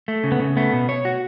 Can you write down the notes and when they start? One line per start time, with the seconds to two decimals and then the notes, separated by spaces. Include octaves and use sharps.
0.08 A3
0.24 C#3
0.32 B3
0.40 C#3
0.57 A3 B3
0.73 B2
0.89 C#5
1.05 F#4